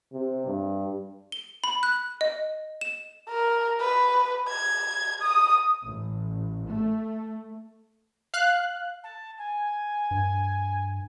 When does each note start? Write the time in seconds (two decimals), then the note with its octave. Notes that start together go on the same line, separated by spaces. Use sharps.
0.13 C3
0.46 G2
1.32 G7
1.64 B5
1.83 F#6
2.21 D#5
2.81 E7
3.29 A#4
3.80 B4
4.48 G#6
5.22 D#6
5.84 A1
6.68 A3
8.34 F5 F#6
9.03 A5
9.38 G#5
10.11 G2